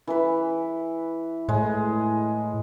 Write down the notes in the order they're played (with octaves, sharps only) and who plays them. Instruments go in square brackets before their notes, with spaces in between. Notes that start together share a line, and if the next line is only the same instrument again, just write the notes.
[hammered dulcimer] E3 B4
[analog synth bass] A2 [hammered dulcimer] G#3